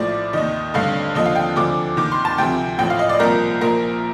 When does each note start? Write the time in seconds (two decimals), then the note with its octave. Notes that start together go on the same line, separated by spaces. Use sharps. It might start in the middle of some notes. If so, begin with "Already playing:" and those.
Already playing: A#1 A2 F3 D5
0.33 D#2 D#3 D#5
0.74 A1 G2 D3 F5
1.15 D#2 D3 F3 D#5
1.26 F5
1.36 G5
1.56 D2 D3 F3 D6
1.97 D#2 D#3 D6
2.12 C6
2.25 A5
2.38 D2 C3 F3 G5
2.79 A1 A2 F3 G5
2.90 F5
2.99 D#5
3.09 D5
3.20 C2 A#2 F3 A#4
3.61 A#1 A#2 F3 A#4